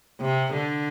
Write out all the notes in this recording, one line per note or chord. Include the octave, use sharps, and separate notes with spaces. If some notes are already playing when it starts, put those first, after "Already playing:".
C3
D3